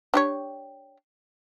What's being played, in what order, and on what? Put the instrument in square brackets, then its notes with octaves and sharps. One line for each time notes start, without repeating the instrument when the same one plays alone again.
[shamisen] D4 G4 C#5